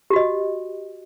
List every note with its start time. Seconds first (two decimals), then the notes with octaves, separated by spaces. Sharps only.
0.10 G4
0.13 F#4
0.16 D#5